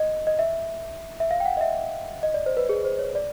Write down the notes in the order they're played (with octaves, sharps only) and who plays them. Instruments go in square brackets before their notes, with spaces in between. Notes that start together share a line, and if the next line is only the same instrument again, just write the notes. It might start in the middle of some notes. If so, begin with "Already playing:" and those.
Already playing: [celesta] D#5
D#5
E5
E5
F5
G5
F#5
D#5
E5
D#5
D5
C5
B4
G#4
C5
C#5
D5